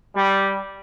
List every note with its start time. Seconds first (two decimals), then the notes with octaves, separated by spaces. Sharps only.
0.14 G3